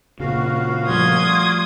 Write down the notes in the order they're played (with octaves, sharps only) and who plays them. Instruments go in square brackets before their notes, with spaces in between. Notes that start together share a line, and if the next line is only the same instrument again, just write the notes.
[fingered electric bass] A#2 C#3 [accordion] F#4 F5
[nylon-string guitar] F3 G3 A3 [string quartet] C6 D#6 G#6